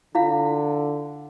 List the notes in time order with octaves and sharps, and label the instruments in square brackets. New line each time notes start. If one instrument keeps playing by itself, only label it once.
[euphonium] D3 [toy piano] E4 F4 F5